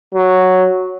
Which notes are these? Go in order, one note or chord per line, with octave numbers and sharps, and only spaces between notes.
F#3